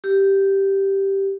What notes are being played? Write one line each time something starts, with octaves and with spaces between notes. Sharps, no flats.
G4